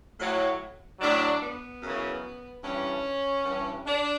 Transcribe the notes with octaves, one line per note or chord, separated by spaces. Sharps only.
A2 F#3
A2 F#3 D4
B3
F#2 C#3 E3
G2 E3 C#4
G2 E3
D4